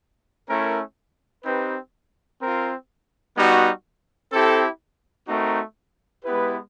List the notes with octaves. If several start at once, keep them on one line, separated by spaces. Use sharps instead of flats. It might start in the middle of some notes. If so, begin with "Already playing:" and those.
A3 C#4 E4 A#4
C4 D#4 G4 B4
C4 F4 A#4
G3 B3 D#4 F#4
C4 E4 G4 A4
A3 C4 D#4 F#4 A#4
G#3 B3 E4 G4 B4